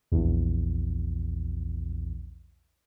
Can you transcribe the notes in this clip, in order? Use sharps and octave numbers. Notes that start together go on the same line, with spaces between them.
A#1 E2